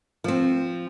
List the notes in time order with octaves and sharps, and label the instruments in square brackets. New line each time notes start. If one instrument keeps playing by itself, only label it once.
[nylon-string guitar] F3 C4